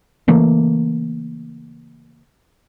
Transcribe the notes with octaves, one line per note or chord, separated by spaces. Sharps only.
C#3 E3 A3 A#3